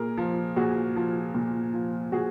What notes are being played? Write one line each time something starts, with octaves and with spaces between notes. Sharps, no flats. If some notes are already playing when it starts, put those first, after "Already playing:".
Already playing: A#2 G#4 A#4
F3
A#2 F#4 G#4
F3
A#2
F3
A#2 F#4 G#4